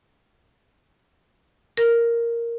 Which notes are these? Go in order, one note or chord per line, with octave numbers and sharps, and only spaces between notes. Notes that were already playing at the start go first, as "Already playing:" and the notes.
A#4